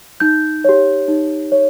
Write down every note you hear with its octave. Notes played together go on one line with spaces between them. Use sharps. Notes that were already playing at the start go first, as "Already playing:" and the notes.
D#4 G6
G4 C#5
D#4
C#5